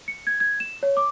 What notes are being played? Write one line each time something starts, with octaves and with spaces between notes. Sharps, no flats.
C#7
G#6
G#6
E7
C#5
D6